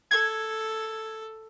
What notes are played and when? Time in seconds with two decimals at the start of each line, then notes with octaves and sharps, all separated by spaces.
0.11 A4 G#6